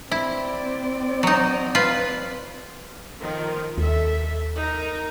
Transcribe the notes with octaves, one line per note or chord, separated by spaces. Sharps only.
C4 E4 D5
F#3 D#4
F4 B4
D#3 F3 A#4
D#2 A4 E5
D#4 A#4 A#5